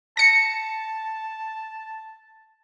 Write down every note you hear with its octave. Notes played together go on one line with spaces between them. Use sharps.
A5 A#6 C#7